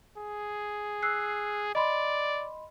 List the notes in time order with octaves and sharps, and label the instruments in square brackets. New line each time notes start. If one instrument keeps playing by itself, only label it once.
[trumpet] G#4
[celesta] E6 F#6 C7
[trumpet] D5 [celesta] D#5 B5 C6